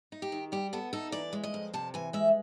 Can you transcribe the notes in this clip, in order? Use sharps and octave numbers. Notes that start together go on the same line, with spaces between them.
D#4
G4
D#3
G3 G4
B3 A4
D#4 A4
E3 D5
G#3
D#5
F2
C3 A5
E3 G#5
G#3 E5